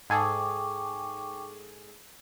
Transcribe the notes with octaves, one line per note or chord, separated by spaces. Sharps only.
G#2 G#4 A4 G5 C#6 D6